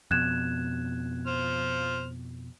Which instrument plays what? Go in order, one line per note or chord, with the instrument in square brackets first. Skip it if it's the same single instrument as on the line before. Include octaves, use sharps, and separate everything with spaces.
[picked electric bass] F2 B2 [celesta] F#6 G#6 E7
[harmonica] C5 F6